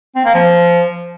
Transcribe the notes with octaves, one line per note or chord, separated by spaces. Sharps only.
C4
A#3
F3